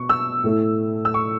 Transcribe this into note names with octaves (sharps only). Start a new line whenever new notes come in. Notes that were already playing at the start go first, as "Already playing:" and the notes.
Already playing: B2 B3 C#6
E6
A2 A3 E4
E6
C#6